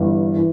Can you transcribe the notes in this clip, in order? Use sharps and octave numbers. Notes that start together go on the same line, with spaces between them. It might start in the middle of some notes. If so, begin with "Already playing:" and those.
Already playing: G1 G2 E3
E3